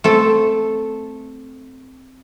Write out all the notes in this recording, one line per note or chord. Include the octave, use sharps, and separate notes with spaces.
A3 C4 A4